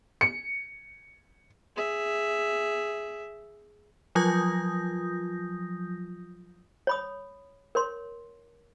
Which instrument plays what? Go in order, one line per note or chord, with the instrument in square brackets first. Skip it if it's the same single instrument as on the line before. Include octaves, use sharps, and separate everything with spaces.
[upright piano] C#7
[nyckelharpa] G#4 E5
[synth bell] F3 F#3 F4 D#6 G6 A#6
[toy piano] C#5 B5 D#6
A#4 C#5 C6